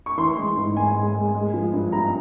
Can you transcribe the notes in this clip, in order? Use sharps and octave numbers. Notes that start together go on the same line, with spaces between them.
C#6
E3 C6
G#3
G#2
G#3 G#5
G#3
G#3
G#3
F3
G2
G2 A#5